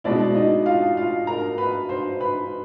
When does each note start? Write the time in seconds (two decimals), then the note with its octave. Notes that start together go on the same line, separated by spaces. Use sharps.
0.04 B2 G#3 C4 D4 E4 D5
0.35 D#4 D#5
0.66 F4 F5
0.97 F4 F5
1.27 A#4 A#5
1.58 B4 B5
1.89 C5 C6
2.20 B4 B5